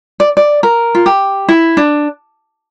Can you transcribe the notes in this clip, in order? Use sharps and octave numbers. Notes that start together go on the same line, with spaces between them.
D5
D5
A#4
F4
G4
E4
D4